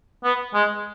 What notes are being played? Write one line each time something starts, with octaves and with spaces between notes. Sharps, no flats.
B3
G#3